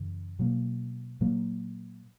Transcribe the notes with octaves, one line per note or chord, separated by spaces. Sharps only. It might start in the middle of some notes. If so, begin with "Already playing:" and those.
Already playing: F#2 C#3 E3
B2 F#3 A#3
A#2 F#3 A#3